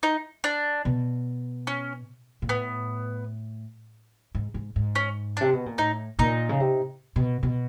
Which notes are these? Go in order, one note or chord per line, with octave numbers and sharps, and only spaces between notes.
D#4
D4
B2
C#4
A#2
A2 B3
G#2
G#2
G#2
C#4
C3 D4
B2
A#2
A2 D#4
A#2 D#4
C#3
C3
B2
B2